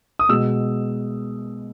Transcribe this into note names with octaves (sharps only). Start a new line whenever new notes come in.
D#6
B2 G#3 E6